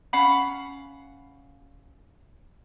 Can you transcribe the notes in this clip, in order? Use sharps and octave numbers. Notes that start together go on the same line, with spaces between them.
C#4 F5 F#5 B5